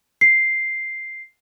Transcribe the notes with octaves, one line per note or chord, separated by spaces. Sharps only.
C7